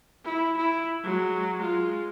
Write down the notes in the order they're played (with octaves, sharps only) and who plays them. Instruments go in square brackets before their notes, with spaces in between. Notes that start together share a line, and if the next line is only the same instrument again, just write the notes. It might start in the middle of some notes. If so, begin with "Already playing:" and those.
[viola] E4
E4
F#3 G#3
G#3 F4